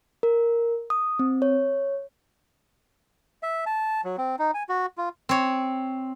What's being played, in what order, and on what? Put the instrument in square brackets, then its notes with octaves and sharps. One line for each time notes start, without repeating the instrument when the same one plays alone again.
[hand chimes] A#4
D#6
C4
C#5
[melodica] E5
A5
F#3
C4
D#4
G#5
F#4
F4
[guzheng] C4 C#5